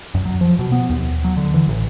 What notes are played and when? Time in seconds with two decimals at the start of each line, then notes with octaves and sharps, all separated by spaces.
0.15 F#2
0.26 F#3
0.41 F3
0.59 B2
0.72 B3
0.90 D#2
1.24 F#3
1.37 D3
1.54 E3
1.68 A1